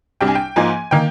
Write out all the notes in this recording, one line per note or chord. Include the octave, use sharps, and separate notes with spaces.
C2 C3 G3 D4 G5
G#5
G5
G#2 F3 A#3 D#4 G#5
D#3 A#3 G5